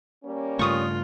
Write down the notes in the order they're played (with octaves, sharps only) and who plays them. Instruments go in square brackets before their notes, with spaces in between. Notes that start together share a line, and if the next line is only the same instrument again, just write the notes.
[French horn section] G3 A#3 C#4
[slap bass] G2 C#3 A3 [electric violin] F4 [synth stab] C#6 D#6